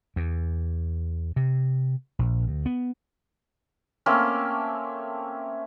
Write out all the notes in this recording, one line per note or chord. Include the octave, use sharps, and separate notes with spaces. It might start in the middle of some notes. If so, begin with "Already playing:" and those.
E2
C3
A#1
D2
B3
A3 A#3 C4 C#4